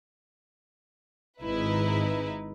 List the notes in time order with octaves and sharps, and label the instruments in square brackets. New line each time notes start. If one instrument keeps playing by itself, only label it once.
[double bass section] G#1 G#2 [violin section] D#4 E4 B4